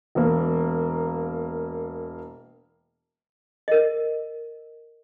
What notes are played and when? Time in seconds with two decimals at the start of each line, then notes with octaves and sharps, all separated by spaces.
0.15 E1 A#3
3.68 A#4 D#5